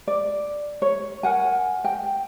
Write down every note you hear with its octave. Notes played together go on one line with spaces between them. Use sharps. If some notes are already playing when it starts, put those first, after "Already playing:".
D5
C#5
A#4 F#5 G#5
G5